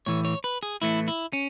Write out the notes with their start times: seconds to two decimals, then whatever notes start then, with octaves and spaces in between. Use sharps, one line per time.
0.06 A2 E3 A3 C#5
0.25 C#5
0.44 B4
0.63 G#4
0.82 A2 E3 A3 E4
1.08 E4
1.33 C#4